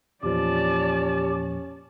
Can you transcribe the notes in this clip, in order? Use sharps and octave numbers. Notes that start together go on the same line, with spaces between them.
E2 A#2 F3 C#4 G4 D5 A5